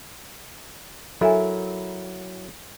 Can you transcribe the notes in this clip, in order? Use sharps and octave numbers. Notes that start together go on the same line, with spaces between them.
F#3 E4 A4 A#4 E5 G#5